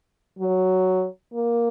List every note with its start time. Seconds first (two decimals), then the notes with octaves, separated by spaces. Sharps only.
0.39 F#3
1.34 A#3